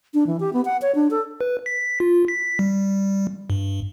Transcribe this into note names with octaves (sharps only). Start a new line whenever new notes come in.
D4
E3
G4
B3
F#5
C#5
D4
A4
B4
B6
F4
B6
G3
G2